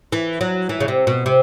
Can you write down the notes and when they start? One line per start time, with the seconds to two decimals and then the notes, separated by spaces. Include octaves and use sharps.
0.12 E3
0.41 F#3
0.69 E3
0.80 C#3
0.88 C3
1.07 B2
1.26 C3